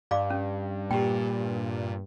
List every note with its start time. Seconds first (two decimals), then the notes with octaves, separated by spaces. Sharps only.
0.11 G2 D5 F5 D6
0.30 C#4
0.91 A#2 G4 G5